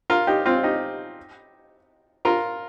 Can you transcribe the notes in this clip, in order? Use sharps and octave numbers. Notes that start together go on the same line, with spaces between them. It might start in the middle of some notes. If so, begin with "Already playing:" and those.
F4 A#4
D#4 G4
C4 F4
D#4 G4
F4 A#4